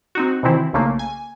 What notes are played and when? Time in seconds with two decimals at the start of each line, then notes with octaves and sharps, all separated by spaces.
0.15 C4 D#4 F#4
0.43 C3 D#3 E3 C4 E4
0.73 B1 C#3 A3 A#3
0.99 G#5